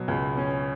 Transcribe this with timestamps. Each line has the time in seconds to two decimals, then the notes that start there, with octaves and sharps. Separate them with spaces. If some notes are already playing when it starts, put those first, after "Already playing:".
Already playing: B2 F#3
0.08 C#2
0.37 C#4